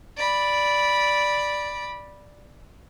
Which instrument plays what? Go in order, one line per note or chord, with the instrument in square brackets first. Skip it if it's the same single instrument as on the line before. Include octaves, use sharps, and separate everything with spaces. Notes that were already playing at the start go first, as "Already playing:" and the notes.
[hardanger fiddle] D5 B5